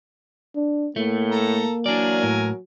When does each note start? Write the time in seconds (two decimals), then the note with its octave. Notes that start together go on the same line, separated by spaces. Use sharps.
0.56 D4
0.96 A2 A3 A#3
1.31 A4 A#5
1.86 E3 F#3 D4 A#4 D5 G#5
2.23 A2